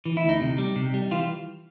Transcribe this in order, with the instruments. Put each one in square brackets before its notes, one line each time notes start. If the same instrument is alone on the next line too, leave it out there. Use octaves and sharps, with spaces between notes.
[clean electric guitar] E3
E4
D2
D#4
C3
G3
C3
G3
E3 F4